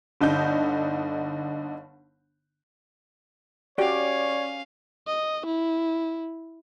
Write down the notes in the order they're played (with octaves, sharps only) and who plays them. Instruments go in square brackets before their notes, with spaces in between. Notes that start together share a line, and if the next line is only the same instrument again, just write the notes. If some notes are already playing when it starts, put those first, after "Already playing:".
[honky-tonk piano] G1 D3 D#4 G6
[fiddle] C#4 F5 [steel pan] F#4 G4 [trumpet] C#5 [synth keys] D5
[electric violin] D#5
E4